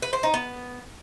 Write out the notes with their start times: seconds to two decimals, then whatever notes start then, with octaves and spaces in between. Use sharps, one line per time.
0.02 B4
0.13 C5
0.23 D#4
0.34 B3